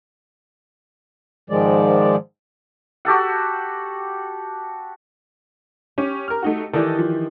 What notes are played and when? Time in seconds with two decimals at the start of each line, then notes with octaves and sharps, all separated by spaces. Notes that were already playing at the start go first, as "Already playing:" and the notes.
1.50 G#2 D#3 F3 G#3 D5
3.05 F#4 G4 A4 F#5
5.98 C#4 G4
6.28 A#4 F6
6.42 A3 D#4 F#4
6.73 D#3 E3 G4 A4 D5 D#5
6.98 F3